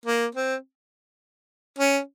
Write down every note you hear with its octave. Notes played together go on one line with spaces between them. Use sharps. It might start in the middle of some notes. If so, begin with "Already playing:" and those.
A#3
C4
C#4